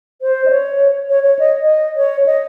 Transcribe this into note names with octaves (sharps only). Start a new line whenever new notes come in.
C5
D#5
C#5
C#5
C#5
D#5
D#5
C#5
D#5